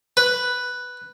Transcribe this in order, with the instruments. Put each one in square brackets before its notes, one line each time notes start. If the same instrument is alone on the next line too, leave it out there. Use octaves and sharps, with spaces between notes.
[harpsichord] B4